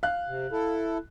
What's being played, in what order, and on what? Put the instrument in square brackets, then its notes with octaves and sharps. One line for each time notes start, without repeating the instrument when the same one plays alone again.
[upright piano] F5 F#6
[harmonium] C3
E4 A4